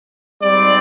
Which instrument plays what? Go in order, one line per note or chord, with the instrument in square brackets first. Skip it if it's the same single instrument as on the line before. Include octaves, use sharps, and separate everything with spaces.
[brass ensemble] G#2 G3 C4 D5